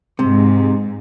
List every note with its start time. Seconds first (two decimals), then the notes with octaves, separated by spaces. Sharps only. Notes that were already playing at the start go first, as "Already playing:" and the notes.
0.19 G#2 C3